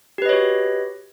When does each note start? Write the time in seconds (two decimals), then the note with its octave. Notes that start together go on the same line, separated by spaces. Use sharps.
0.18 G4
0.22 B4
0.26 D#5
0.29 C#5
0.33 F#4